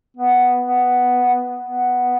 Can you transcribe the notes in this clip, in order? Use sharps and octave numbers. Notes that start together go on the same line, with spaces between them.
B3
B3
B3